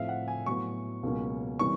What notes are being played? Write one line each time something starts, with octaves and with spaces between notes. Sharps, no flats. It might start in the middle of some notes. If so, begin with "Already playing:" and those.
Already playing: A2 F3 A3 C4 E5 F5
F#5
G#5
A2 F#3 B3 C#6
C#2 B2 F#3 A#3 C#4
C3 E3 G3 A#3 C#4 C#6